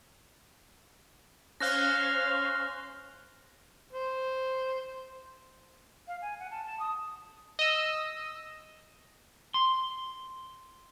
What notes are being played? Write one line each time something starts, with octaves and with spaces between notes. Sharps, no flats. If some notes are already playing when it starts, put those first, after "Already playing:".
C#4 C5 F5 F6 F#6 A#6
C5
F5
G#5
F#5
A5
A5
D#6
D#5 E6
C6